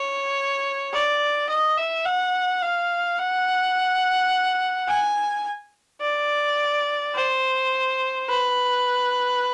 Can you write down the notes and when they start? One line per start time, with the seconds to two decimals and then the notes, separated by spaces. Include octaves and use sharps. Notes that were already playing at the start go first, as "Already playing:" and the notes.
Already playing: C#5
0.92 D5
1.49 D#5
1.77 E5
2.05 F#5
2.62 F5
3.18 F#5
4.88 G#5
6.02 D5
7.15 C5
8.28 B4